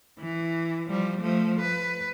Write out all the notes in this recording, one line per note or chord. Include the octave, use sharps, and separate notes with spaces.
E3
F3 G3
F3 A3
B4